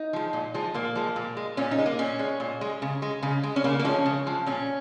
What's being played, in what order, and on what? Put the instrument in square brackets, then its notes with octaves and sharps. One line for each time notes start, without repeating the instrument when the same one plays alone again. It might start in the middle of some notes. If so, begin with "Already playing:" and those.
Already playing: [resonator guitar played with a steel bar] D#4
F3 G#3
A#2
F3 G#3
A#2 A#3
F3 G#3
A#2
G#3
A#2 C#4
D#4
G#3
A#3
A#2 C#4
G#3
A#2
G#3
C#3
G#3
C#3
G#3
C#4
C#3 A#3
A#3
F3 G#3 C#4
C#3
F3 G#3
A#2 C#4